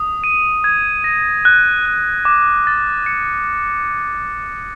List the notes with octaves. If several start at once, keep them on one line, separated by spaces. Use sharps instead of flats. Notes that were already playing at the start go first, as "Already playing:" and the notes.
Already playing: D#6
D#7
G#6
A#6
F#6
F#6
D6
A6
C#7